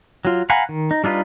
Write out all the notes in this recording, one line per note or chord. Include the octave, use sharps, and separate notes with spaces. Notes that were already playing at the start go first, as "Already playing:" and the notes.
F#3 F4
F5 F#5 G#5 A#5 B5
D#3
D#4
G3 D4 D#4 F4 B4